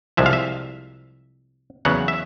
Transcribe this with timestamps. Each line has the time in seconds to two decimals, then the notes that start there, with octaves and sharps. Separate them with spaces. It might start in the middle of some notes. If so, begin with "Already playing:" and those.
0.17 C2 C3 F3 G#3 E5
0.26 F5
0.33 E5
1.85 E2 C#3 F#3 B3 F#5
2.08 E5